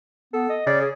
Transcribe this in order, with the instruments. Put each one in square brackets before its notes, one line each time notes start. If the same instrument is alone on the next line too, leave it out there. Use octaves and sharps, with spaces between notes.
[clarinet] B3 [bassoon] A4
[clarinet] D#5
[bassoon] C#3 [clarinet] D5
[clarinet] G#4